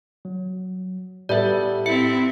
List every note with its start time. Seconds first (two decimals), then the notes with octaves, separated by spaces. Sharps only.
0.25 F#3
1.29 A2 G3 B3 A4 D5 E5
1.86 C4 E4 E5 C#7